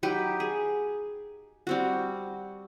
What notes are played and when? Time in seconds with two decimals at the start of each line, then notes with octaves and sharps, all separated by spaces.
0.03 F#3 D#4 G4 B4
0.40 G#4
1.67 G3 C4 F#4